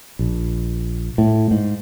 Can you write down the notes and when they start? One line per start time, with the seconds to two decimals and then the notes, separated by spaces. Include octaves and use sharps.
0.19 A#1
1.18 A2
1.51 G#2